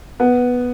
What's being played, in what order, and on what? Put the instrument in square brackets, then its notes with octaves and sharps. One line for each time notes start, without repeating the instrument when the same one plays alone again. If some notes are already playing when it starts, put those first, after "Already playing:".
[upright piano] B3